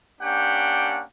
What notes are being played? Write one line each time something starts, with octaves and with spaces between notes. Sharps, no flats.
A#3 C#4 D4 G4 F#5 G5